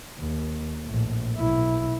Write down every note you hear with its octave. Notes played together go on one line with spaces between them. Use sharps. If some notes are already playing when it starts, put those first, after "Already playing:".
D#2
A#1 A2
B1 E4